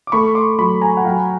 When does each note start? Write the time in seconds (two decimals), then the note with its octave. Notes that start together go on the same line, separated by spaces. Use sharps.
0.07 D6
0.12 A3 B5 C#6
0.35 C6 D6
0.58 F#3 B5 C#6
0.82 G#5 A#5
0.97 F#5
1.04 F#3 F5 G5